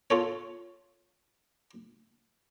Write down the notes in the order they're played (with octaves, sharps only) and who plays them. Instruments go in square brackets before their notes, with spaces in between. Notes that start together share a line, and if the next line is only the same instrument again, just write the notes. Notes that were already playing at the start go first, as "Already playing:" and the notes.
[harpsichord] F4 A4 C#5